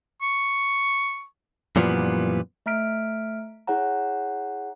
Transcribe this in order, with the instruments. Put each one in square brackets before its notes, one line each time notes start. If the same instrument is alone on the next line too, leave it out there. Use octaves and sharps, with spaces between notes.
[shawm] C#6
[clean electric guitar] F#2 A#2 E3 F3 G3 B3
[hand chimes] A3 E5 A#5 F6 B6 D7
E4 G#4 C#5 F#5 A#5